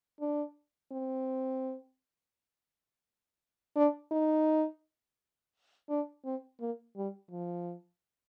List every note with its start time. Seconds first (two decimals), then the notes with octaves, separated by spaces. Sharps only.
0.20 D4
0.91 C4
3.76 D4
4.11 D#4
5.89 D4
6.25 C4
6.60 A#3
6.96 G3
7.31 F3